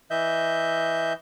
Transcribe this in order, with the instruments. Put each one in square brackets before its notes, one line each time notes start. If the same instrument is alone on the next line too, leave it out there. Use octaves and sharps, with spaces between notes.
[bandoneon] E3 D#5 E5 G6